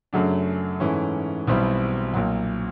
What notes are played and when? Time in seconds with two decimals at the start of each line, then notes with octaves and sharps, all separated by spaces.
0.13 F#2 C#3 F#3 A3 D4
0.80 G#2 E3 A3 C#4
1.47 B1 B2 G3 C4 E4
2.13 B1 A#2 F#3